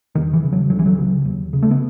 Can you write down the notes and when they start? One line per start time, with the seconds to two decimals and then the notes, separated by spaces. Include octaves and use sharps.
0.15 E2 D#3
0.33 E3
0.44 C#3
0.52 F#3
0.70 C#2 F#3
0.79 E3
0.86 F#3
0.98 C#3
1.25 D#2
1.53 C#3
1.63 A3
1.71 B3